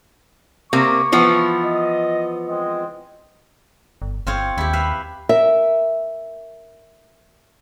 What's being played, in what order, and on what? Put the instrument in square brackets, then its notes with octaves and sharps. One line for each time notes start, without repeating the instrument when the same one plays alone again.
[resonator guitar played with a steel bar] C3 A#3 [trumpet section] C#6
[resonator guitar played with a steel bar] E3 F3 B3
[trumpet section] D#5
G#3 C4 D#5
[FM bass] G1
[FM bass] G1 [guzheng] C4 F4 C#5
[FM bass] D#2 [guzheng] E4 G4
[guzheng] B4 E5 F5
[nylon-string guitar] A#4 E5